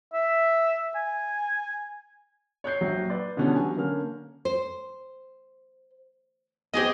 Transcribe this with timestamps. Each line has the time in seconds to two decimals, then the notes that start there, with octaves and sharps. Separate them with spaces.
0.13 E5
0.95 G#5
2.64 C#5 F#6 G6 C7
2.81 A#1 F#3
3.10 B4 D5
3.37 B2 D3 E3 G3 B3 C#4
3.56 F#3 G#5
3.77 D3 A#3 C#4 F6
4.45 C5
6.73 B3 C4 G4 G#4 D#5